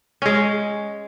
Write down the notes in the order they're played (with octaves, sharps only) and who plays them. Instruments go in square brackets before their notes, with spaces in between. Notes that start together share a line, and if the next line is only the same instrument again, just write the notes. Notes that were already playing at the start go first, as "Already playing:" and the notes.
[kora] G#3 C#4